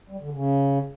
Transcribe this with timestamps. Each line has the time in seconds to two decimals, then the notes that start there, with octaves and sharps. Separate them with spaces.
0.10 G3
0.21 D3
0.32 C#3